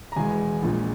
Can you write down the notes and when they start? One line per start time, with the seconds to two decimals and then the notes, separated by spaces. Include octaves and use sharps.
0.12 A#5
0.16 E1 E2 E3 G#3 G#5
0.62 A#1 A#2 G#3